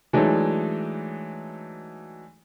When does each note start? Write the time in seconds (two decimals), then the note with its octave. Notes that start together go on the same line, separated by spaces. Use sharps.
0.13 E3 F#3 G#3 A3 D4 D#4